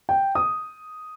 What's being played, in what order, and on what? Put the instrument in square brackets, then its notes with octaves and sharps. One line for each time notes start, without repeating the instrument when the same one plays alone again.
[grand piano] G5
D#6